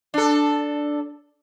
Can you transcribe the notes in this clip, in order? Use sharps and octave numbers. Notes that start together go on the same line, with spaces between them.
D4 A4